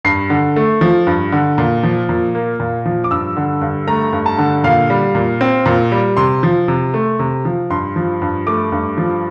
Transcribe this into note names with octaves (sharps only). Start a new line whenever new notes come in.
G2 C7
D3
A3
F3
G2
D3
A#2
F3
A#2
A#3
A#2
F3
D6
G2 E6
D3
G2
A3 A#5
G2
A5
D3
A#2 F5
G3
A#2
C4
A#2
G3
C3 C6
F3
C3
A3
C3
F3
G2 C6
F3
G2
A3 D6
G2
F3